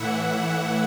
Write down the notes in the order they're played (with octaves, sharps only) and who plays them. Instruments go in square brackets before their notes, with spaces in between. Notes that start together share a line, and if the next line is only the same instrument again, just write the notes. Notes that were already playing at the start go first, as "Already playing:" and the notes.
Already playing: [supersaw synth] A2 E3 E5 F#5